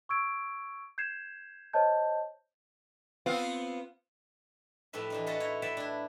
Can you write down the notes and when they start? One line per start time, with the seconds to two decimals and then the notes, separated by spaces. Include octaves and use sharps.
0.09 C#6 E6 G#6 D7
0.98 G6 G#6 C7 E7
1.73 C5 C#5 D#5 A5 G6
3.26 B3 C4 F4
4.93 A2 F3 A3 G4 B4 E5
5.10 E3 D4 D#4
5.26 F4 F#4 A4 B4 D#5 F#5
5.40 E4 C#5 D#5
5.62 B4 D5 E5 F#5 G5 A5
5.77 D4 E4